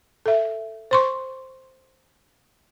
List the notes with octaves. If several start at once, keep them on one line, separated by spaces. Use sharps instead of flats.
A4 E5
C5 C6 C#6